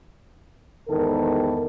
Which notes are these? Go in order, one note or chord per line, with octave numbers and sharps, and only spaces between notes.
E2 G#2 D#3 A4 A#4